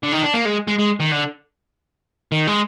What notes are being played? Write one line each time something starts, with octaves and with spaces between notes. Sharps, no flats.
D3
D#3
D4
A#3
G#3
G#3
G#3
D#3
D3
D#3
G#3